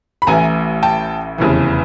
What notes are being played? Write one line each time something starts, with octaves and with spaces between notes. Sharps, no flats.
B5
A1 A2 E3 G#5 A#5
G5 A5
F1 E2 C#3 E3